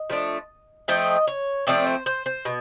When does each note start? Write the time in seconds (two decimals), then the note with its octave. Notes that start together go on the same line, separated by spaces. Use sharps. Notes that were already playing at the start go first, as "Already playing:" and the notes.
Already playing: D#5
0.10 F3 A3 D4
0.88 F3 A3 C4 D#5
1.27 C#5
1.67 F3 A3 C4 D5
1.87 C5
2.06 C5
2.26 C5
2.45 B2